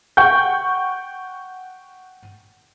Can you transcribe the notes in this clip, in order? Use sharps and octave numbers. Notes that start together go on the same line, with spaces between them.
F#5 G5 C#6 G6